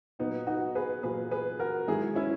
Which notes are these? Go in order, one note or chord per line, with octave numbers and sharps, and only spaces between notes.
A#2 F#3 B3 D#4
D#4 F#4
G#4 B4
A#2 F#3 G#4 B4
G#4 B4
F#4 A#4
G#2 D#3 F#3 E4 G#4
C#4 E4